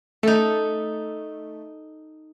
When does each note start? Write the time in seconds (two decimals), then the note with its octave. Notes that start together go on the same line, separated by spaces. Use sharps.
0.23 A3 D#4 A4